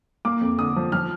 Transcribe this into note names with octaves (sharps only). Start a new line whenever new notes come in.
A#3 D6
F2
D3 D#6
F3
F3 F6